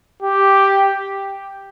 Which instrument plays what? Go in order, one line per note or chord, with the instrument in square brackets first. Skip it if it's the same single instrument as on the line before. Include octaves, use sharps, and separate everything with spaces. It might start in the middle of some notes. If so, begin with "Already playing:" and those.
[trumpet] G4